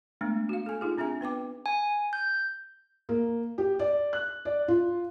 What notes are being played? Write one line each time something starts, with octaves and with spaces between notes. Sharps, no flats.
G#3 A3 B3 D4
F#4 F5
A4 G#5
D#4 F4 G#4
C4 D4 G#4 E5 G#5
B3 B4 G5 D6
G#5
G6
A#3
G4
D5
F#6
D5
F4